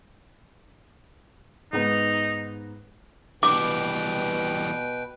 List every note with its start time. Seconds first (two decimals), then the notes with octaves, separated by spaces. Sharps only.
1.73 G#2 B3 D#4
3.43 B2 E3 G3 B4 G5 D6